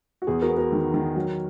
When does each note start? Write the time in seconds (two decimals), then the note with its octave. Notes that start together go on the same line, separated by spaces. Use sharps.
0.22 F#4
0.27 E2 G#4
0.42 F#4 A#4
0.50 B3
0.57 F#4 A#4
0.72 D#3
0.94 D#3
1.16 F#3